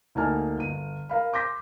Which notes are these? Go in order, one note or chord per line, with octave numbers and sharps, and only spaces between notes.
D2 A#3 D#4 G#5 A5 F6
G1 D#7
A#4 F5 B5
C6 D6 G6 A#6 B6